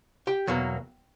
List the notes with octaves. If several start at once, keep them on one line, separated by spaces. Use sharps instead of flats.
G4 G5
E2 B2 F#3 A#3